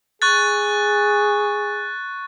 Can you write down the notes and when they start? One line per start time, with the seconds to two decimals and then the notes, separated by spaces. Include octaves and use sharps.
0.22 G#4 C#6 F#6 A6